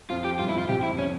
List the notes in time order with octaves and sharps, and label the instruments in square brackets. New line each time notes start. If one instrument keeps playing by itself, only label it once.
[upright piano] F2 [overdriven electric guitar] F4
[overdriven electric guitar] G4
[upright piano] G2 [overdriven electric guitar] F4
[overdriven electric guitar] E4
[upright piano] G#1 G#2 [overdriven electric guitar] F4
[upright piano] C2 C3 [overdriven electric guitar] G4
[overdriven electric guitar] E4
[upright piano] F2
[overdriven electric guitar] C#4